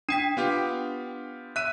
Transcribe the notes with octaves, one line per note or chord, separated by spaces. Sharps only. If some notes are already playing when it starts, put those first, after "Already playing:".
D4 G5 B6 D#7
B3 F4 G4
E5 F#6 D#7